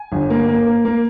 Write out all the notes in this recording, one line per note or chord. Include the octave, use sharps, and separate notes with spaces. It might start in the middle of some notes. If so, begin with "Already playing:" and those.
Already playing: G#5
G1
A#3
A#3
A#3
A#3